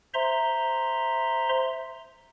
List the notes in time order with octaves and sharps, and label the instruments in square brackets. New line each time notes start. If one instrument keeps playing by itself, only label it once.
[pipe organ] C5 E5 A#5 C6